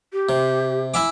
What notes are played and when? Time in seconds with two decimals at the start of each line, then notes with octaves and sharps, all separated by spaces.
0.13 G4
0.29 C3
0.94 E4 E5 G#5 D6